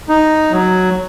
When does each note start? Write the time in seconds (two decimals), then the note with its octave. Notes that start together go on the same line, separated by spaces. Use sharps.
0.09 D#4
0.52 F#3